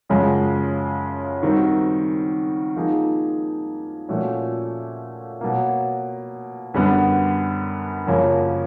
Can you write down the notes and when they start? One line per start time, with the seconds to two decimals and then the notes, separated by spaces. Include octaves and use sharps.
0.09 F#2 C#3 F3 G#3
1.43 D#3 G3 C4 D#4 F#4
2.76 F3 A#3 D#4 G#4
4.09 A#2 F3 A3 C#4 F#4
5.41 B2 F#3 A#3
6.74 F#2 D3 G3 B3
8.07 F#2 C#3 F3 A#3 C#4